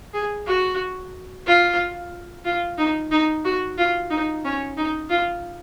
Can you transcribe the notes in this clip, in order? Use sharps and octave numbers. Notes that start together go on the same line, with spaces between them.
G#4
F#4
F4
F4
D#4
D#4
F#4
F4
D#4
C#4
D#4
F4